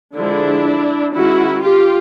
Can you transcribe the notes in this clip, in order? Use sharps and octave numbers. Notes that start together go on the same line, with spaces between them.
D3 F3 G#3 D4 E4
D#3 G#3 C#4 E4 F#4
F4 G4